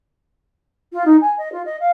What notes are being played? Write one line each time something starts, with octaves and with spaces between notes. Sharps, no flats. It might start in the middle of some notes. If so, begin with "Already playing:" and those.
F4
D#4
G#5
D#5
F4
D#5
F5